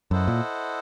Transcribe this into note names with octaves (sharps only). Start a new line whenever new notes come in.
F#2 E4 A4 C5 D#5 F#5
A#2